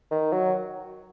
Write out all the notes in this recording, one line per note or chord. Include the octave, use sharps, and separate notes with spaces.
D#3
F#3